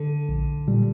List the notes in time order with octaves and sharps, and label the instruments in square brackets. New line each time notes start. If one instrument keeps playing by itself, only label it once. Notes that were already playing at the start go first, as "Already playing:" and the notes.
Already playing: [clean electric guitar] D3
[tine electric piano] A#1
A#2 G3